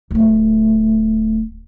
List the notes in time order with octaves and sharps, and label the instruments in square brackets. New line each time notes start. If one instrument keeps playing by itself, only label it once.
[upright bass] D1 A3